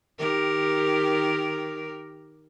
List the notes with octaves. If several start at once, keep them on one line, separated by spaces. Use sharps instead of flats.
D#3 G4 A#4